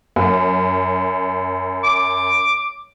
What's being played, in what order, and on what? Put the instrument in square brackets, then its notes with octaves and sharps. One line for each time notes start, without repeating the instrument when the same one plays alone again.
[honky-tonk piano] F#2
[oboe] D6